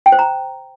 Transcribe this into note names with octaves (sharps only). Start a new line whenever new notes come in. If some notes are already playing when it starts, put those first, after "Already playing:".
G5
C5
A#5